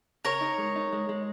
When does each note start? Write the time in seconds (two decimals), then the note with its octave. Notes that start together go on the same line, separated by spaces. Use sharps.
0.25 C#3 A#4 C#5
0.41 D#4
0.58 G#3
0.76 D#4
0.92 G#3
1.09 G#3